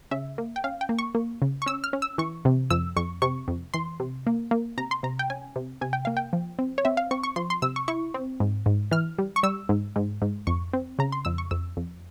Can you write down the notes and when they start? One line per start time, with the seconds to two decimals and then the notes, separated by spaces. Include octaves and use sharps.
0.11 C#3 E5
0.38 A#3
0.56 G5
0.64 C#4 F5
0.81 G5
0.89 A#3
0.99 C#6
1.15 A#3
1.42 C#3
1.62 C#6
1.66 C#4 E6
1.84 F6
1.93 C#4
2.02 E6
2.18 E3 C#6
2.45 C3
2.70 F2 E6
2.97 F2 C#6
3.22 C3 C#6
3.48 F2
3.74 E3 C6
4.00 C3
4.27 A#3
4.51 A#3
4.78 C3 A#5
4.91 C6
5.03 C3 A#5
5.19 G5
5.30 C#4 G#5
5.56 C3
5.81 C3 G#5
5.93 G5
6.05 A#3 F5
6.17 G5
6.33 F3
6.59 C4
6.78 C#5
6.85 C4 E5
6.97 F5
7.11 C4 C#6
7.23 C#6
7.36 F3 C6
7.50 C6
7.62 C3 E6
7.76 C#6
7.88 E4 C#6
8.14 C4
8.40 G#2
8.66 G#2
8.91 E3 F6
9.19 G3
9.36 C#6
9.43 G3 E6
9.69 G#2
9.96 G#2
10.22 G#2
10.47 F2 C#6
10.73 C4
10.99 C#3 A#5
11.12 C6
11.25 F2 E6
11.38 C#6
11.51 F2 E6
11.77 F2